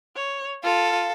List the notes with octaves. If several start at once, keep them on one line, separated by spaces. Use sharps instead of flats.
C#5
F4 A4 F5